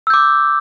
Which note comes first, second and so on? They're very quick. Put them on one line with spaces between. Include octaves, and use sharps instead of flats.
E6 G6 D6